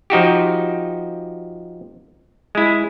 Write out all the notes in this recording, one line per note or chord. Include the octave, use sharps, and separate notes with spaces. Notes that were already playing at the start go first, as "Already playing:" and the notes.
F3 D#4 F#4 G4
G#3 E4